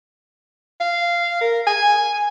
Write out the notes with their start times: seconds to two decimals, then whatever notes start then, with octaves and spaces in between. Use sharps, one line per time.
0.80 F5
1.41 A#4
1.67 G#5